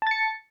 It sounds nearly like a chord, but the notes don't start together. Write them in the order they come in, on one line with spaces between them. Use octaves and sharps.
A5 A6 C#7